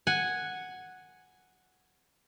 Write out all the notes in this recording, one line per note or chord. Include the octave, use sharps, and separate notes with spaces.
F#5 G#5